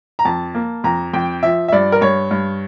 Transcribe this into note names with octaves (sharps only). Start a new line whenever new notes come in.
A#5
F2 A5
A#3
F2 A#5
F2 G5
F3 E5
E5
G2 D5
A#4
G2 C#5
G2